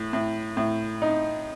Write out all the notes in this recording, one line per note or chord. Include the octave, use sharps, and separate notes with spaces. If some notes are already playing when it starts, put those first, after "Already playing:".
Already playing: A2
A2
A2
D#4